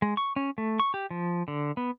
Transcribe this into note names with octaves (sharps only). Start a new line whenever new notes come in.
G#3
C#6
C#4
A3
C#6
G4
F3
D3
B3